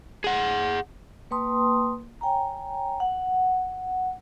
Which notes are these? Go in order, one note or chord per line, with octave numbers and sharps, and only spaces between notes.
G#4 F#5
A#3 B4 G5 A5 C6 D#6
C#5 G5 G#5 A#5
F#5